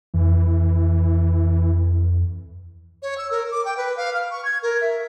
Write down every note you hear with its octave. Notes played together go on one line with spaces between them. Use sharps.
F2 E3
C#5
E6
A#4
D6
G5
B4
F5
F6
C#6
G#6
A#4
E5